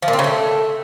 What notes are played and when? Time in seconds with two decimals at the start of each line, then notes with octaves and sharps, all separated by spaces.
0.02 F3
0.08 A#2
0.13 C4
0.19 C#3
0.24 A3